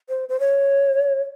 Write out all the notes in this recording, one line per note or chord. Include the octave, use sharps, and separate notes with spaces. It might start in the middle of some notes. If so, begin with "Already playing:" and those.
C5
C5
C#5